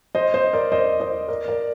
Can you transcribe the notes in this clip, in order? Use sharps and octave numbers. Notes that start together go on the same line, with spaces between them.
C5 D#5
C5 D#5
A#4 D5
C5 D#5
C5 D#5
A#4 D5
A#4 D5